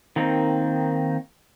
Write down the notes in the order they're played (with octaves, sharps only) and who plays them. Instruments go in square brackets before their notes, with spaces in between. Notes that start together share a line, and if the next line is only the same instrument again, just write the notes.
[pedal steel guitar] D#3 A#3 C4 D#4